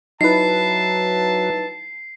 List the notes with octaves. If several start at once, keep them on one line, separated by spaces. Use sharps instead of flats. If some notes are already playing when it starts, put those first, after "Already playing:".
F#3 D#4 E4 B4 E5 A5 C7